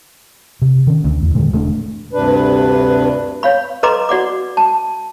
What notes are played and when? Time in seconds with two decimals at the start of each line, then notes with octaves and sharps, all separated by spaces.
0.62 C3
0.87 D#3 C#4
1.04 D2
1.22 E2
1.34 A#2 D3 D#3 G#3
1.53 E1 A3 B3 D4
2.13 D2 G2 C3 D4 B4
3.43 C#5 F5 B5
3.83 A4 B4 D#5 A#5 C6 D6
4.09 F#4 D5 F#5 D6
4.57 A5